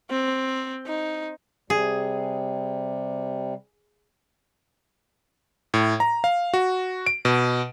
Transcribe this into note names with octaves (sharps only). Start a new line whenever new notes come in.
C4
D#4
C3 G3 G#4
A2
A#5
F5
F#4
D7
B2